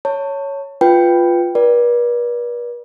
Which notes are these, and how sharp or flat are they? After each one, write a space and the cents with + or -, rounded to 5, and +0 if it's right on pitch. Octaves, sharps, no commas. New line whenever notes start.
C#5 +5 A5 +30
F4 +0 B4 +0 G5 +0
B4 -45 D5 +0